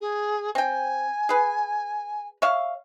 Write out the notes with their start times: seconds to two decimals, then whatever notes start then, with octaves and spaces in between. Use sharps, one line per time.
0.01 G#4
0.55 C4 G5 G#5
1.29 G#4 B4
2.42 C#5 E5 F5